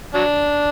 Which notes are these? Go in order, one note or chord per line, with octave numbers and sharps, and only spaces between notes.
F#3 D4